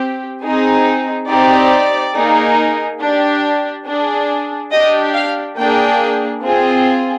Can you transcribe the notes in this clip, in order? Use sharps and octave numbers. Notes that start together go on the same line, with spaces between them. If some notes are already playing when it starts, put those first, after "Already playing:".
Already playing: C4 G4
C4 D#4 G#4
C4 D#4 G4 D5
A#3 D#4 G#4
D4 G4
D4 G#4
D4 G4 D#5
F5
A#3 D4 G#4 G5
C4 F4 G#4